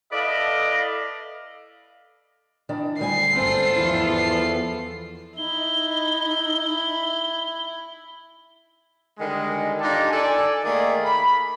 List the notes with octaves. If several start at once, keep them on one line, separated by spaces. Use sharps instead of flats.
E4 A4 B4 D5 D#5 F5
D#3 E3 D4
D2 G3 G#5 C7
G#1 C4 F4 A4
E2 F3 E4
C7
D#4 E4 G7
D3 D#3 G3 G#3
D4 D#4 F4 G4 A4 D5
A4 D5 G#5
D#3 A3 A#3 G#4 D5
B5